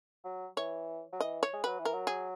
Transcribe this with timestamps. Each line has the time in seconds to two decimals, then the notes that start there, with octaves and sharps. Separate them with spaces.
0.25 F#3
0.57 E3 C#5
1.13 F#3
1.20 E3 D#5
1.43 C#5
1.53 G#3
1.64 F#3 B4
1.79 E3
1.85 A#4
1.94 F#3
2.07 G#4